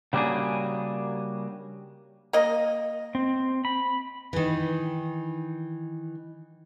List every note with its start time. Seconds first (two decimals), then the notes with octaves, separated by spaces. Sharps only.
0.13 C#3 G3 A#3 D4 F#4 G#4
2.33 A#3 D#5
3.15 C4
3.65 B5
4.33 D#3 E3